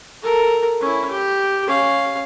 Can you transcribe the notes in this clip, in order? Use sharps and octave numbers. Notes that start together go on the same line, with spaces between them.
A4 A#4
C#4 E4
G4
C#4 F5